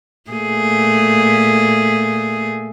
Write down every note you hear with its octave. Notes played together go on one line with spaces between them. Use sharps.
A#2 A3 G#4